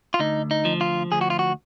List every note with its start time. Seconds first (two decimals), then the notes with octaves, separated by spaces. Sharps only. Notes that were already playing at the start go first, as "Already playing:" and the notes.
0.14 F4
0.19 D2 D#4
0.51 D#4
0.65 F3
0.81 F4
1.12 D2 G#4
1.21 F#4
1.30 F4
1.39 F#4